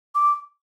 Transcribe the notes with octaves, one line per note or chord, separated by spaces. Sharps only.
D6